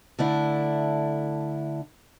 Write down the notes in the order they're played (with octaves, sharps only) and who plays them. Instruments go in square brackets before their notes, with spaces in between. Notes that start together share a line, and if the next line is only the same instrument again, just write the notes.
[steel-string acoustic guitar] D3 A3 D4 E4